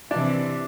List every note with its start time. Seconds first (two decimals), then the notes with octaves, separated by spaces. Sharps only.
0.11 C3 E3 D4